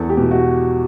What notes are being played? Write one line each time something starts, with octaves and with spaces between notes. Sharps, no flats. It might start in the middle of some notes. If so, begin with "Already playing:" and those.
Already playing: E2 A4
G4
B2
F#4